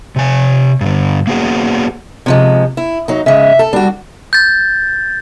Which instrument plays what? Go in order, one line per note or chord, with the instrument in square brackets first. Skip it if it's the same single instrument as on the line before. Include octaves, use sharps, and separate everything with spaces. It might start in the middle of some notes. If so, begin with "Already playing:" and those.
[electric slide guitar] C3 G#5
G2 D3
A#3 B3 F#4 G#4
[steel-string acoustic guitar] C3 F3 G#3
E4
F#3 D#4
[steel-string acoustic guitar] C#3 G#3 [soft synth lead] E5
[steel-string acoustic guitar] A4
[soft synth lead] G3 [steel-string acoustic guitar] D4 F#4
[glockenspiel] G6 A6